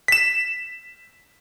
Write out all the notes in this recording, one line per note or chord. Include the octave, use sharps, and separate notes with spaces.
B6 E7